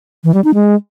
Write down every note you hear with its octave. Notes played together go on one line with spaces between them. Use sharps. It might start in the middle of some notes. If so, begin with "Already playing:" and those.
E3
G3
D#4
G#3